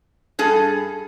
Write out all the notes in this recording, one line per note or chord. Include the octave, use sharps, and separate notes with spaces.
G2 G#4 A4